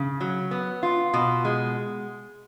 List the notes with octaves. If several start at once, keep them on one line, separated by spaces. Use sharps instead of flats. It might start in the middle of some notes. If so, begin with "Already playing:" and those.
Already playing: C#3
F#3
B3
F4
B2
G#3